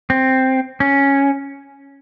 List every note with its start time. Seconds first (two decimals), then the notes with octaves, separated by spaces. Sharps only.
0.10 C4
0.80 C#4